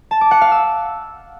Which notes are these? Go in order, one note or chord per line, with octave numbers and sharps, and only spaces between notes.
A5
D6
F#5
F5
E6